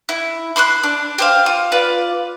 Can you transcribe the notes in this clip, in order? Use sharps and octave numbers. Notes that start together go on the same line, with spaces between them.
E4
B5 C6 D6 F#6
D4
G4 C5 F5
F4
F4 B4 D5